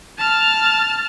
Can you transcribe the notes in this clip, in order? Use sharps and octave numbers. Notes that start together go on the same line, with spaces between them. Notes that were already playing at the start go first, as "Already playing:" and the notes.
A5 F6